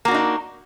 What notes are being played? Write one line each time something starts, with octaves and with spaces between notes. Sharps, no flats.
A#3 D4 D#4 F#4